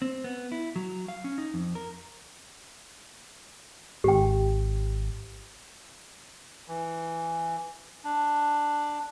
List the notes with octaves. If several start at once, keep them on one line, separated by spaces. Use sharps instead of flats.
C4
B3
E4
F#3
F5
C#4
D#4
F2
A#4
G#1 G4 G5
E3
D4